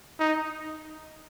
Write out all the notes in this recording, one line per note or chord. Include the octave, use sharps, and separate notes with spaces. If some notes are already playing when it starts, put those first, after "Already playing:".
D#4